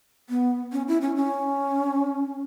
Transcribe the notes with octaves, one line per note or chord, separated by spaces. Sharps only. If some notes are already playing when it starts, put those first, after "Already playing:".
B3
C#4
E4
C#4
C#4